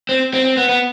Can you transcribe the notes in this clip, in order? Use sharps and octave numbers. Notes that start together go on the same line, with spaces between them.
C4
C4
C4
B3
B3